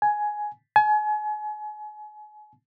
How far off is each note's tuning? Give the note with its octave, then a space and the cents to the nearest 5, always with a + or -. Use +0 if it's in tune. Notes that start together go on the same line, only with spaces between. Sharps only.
G#5 +10
G#5 +35